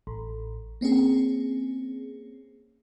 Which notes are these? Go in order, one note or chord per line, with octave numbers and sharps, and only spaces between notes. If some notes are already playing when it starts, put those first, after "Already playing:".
A1
A#3 C4 C#4 G#4